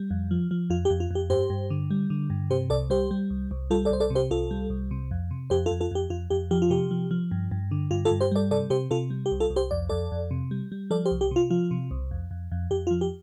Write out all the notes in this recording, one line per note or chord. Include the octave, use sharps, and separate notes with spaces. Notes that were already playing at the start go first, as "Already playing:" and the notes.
Already playing: G3
F2
F3
F3
F2 F4
G4
F2
F4
F2 G4
G2 G4 C5
G2
D3
G3
D3
G2
C3 G4 C5
C2 A4 D5
G3 G4 C5
G3
C2
C2
G3 F4 A4
A4 D5
C2 C5
A4 D5
C3
G4 C5
C2 F4 A4
G3
C2
C3
F2
C3
F2 G4 C5
F4 A4
F2
F4 A4
F2 G4
F2 F4
F2 G4
F3 G4
F4
C3 G4
F3
F3
G2
G2
D3
G2 F4
F4 A4
G2
G4 C5
G3 A4 D5
C3 A4 D5
C3 G4 C5
C3 F4 A4
G3
G4
C2
F4 A4
C2
G4 C5
F2 D5
F2 A4 D5
F2
C3
G3
G3
F3 A4 D5
G4 C5
C2
G4
C3 F4
F3 F4
C3
C2
F2
F2
F2
F2 G4
F4
F3
G4